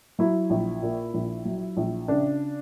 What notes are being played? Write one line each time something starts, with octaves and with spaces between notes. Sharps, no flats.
F#3 E4
A#1
A#2
A#1
F#3
A#1
C#3 D4